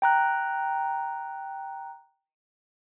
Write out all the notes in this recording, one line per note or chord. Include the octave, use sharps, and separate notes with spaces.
G5 A#5 F#6